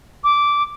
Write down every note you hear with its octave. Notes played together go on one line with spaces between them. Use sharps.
D6